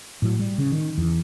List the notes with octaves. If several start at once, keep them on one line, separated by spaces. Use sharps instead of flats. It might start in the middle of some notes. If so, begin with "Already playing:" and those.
A2 F#3
G3
C#3
D#3
E2